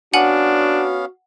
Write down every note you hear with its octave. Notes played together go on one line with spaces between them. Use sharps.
B3 C#4 D4 F#4 F5 F#5 G#5 F#7